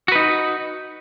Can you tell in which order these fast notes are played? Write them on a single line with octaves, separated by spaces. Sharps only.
F#4 B4 D#4